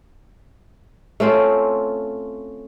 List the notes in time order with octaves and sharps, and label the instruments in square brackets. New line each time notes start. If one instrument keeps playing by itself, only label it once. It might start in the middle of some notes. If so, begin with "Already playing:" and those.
[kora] A3 C4 C#4 F4